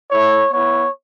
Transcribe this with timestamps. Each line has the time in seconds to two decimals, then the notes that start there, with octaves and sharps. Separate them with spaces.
0.11 A3 E4 C#5
0.52 B3 E4 C#5